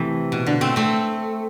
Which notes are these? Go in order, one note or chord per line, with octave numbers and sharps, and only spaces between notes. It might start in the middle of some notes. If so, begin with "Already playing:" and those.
Already playing: C3 E3 A3
B2
D3
A3 C4
A3 C4